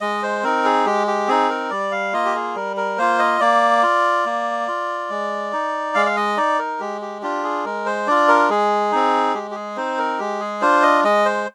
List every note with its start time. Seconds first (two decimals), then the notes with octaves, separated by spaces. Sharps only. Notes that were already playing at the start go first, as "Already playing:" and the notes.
0.01 G#3 D#5
0.23 C5
0.43 C4 D#4 A#4
0.65 G#4
0.86 G#3 G4
1.07 G4
1.28 C4 D#4 G#4
1.50 A#4
1.70 G3 D5
1.91 F5
2.13 A#3 F4 D#5
2.25 G4
2.35 G#4
2.55 G3 A#4
2.77 A#4
2.98 A#3 F4 C5
3.19 D#5
3.40 A#3 D5
3.83 F4
4.25 A#3
4.68 F4
5.10 G#3
5.53 D#4
5.95 G#3 F5
6.06 F5
6.16 D#5
6.37 D#4 D5
6.59 A#4
6.80 G#3 G4
7.01 G4
7.22 D4 F4 G4
7.43 G#4
7.65 G#3 A#4
7.86 C5
8.07 D4 F4 D5
8.28 A#4
8.50 G#3 G#4
8.92 C4 D#4
9.34 G#3 G4
9.51 G4
9.55 G#4
9.76 C4 D#4 C5
9.98 A#4
10.19 G#3 G4
10.40 G#4
10.61 D4 F4 C5
10.82 D#5
11.04 G#3 D#5
11.25 C5